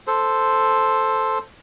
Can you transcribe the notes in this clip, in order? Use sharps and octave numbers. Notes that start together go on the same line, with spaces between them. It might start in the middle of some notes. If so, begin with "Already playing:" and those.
A4 C5